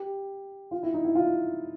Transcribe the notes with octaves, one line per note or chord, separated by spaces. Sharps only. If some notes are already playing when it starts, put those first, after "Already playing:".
Already playing: G4
F4
E4
D#4
E4
F4